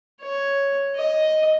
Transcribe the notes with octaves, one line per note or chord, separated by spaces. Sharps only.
C#5
D#5